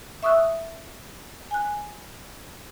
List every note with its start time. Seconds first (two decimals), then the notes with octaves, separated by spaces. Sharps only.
0.23 E5 C#6 D#6 E6 F#6
1.51 G#5 F#6